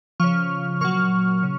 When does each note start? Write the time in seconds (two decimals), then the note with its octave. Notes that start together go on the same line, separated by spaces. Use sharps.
0.20 C#3 F3 C#6 F6
0.81 A#2 F#3 C#6 F6
1.43 C#3